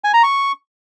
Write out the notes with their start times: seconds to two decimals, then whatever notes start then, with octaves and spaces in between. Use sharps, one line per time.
0.04 G#5
0.14 A#5
0.23 C#6